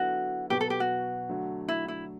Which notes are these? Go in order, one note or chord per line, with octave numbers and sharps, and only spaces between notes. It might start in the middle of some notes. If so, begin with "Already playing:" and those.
Already playing: D3 F#3 B3 E4 F#4 A4
B2 F#3 B3 G4
A4
G4
F#4
D3 F#3 A3
E4
E4